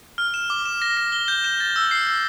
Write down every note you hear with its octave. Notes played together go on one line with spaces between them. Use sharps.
F6
E7
D6
E7
A#6
A#6
G7
G6
E7
A6
E6
C7
E6